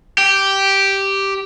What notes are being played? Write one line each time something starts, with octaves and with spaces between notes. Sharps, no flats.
G4